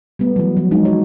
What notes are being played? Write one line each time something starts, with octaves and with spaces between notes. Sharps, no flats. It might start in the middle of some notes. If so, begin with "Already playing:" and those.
G3 A3 B3
E3 F#3
F3 F#3
G#3 D#4
F#4 C#5